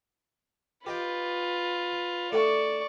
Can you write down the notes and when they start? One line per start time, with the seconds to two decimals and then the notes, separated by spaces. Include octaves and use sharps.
0.86 F4 G4 B4 D#5 G5
2.32 A3 D4 A4 D5 C#6